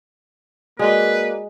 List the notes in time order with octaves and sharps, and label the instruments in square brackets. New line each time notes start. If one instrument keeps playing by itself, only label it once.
[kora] G#3 [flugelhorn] A#3 [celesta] F#4 D5 D#5 [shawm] B4